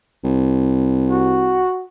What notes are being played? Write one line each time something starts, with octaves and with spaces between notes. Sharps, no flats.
C2
F#4